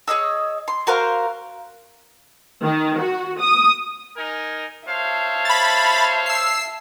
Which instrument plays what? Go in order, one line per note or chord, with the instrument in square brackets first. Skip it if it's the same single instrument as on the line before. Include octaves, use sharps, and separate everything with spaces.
[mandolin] G#4 C#5 D#5 E6
C6
F#4 A#4 C5 F5
[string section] D#3
F#4
D#6
[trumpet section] D#4 A#4 G#5
[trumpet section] C5 C#5 F5 [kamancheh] E5 A5
[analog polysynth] B5 A6
E6 C7